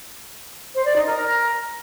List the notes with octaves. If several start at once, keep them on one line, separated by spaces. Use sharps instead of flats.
C5
D5
D#4
A#4